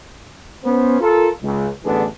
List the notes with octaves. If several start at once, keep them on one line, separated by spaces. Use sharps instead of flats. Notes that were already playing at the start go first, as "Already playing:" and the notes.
B3 C#4 C5
F4 A4 A#4
C#2
A1 D3 E3 B3 D4 G#4